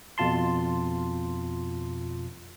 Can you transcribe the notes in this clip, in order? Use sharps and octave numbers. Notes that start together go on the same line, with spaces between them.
F2 B2 F4 A5 C6